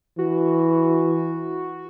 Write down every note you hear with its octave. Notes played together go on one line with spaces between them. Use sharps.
E3 F#4